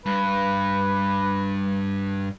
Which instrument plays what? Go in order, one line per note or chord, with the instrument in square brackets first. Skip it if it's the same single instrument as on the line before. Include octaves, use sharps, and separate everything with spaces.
[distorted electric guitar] G2 [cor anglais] B4